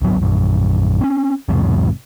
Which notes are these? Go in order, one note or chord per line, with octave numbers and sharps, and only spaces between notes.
D1 G#1 F#3 B3
A#1 F#2
C4 C#4
B1 E2 G#2 C3